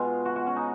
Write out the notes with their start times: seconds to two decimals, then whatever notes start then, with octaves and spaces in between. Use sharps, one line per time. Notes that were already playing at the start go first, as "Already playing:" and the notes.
Already playing: B2 G#3 F4
0.25 F#4
0.36 F#4
0.47 C#4
0.56 D#4